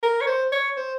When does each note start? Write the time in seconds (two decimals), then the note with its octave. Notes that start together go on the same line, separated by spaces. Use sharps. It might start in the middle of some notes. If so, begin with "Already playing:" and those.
0.03 A#4
0.21 C#5
0.27 C5
0.52 C#5
0.77 C5